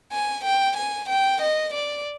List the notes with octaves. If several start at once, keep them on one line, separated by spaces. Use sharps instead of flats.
G#5
G5
G#5
G5
D#5
D5